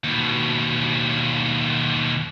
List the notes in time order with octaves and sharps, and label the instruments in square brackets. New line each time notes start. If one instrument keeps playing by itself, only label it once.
[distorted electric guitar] D#2 B2